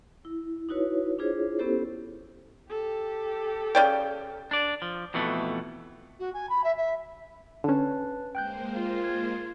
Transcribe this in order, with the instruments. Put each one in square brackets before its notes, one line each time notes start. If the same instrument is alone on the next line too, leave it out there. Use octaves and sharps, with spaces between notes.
[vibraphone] E4
D#4 E4 F#4 B4 C#5
D4 E4 F4 G#4 C5 C#5
B3 C#4 E4 G4 A4 C5
[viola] G4 A4
[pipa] C#3 D5 G5
[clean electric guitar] D4 D5
F3
F2 B2 E3 A3
[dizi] F#4
G#5
B5
E5
E5
[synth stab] D3 C#4 [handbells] B4 A5
[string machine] G#3 A#3 C5 [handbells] G5 F#6 G6
[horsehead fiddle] F4
[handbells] G#6